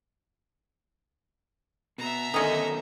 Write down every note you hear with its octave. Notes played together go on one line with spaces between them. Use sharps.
B2 E5 A#5
B2 D3 D#3 A3 C#4 D#4 D#5